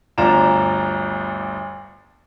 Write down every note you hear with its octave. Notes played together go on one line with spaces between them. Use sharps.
G1 D2 F4 D5 A#5 E7